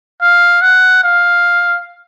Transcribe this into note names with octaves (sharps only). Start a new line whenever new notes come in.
F5
F#5
F5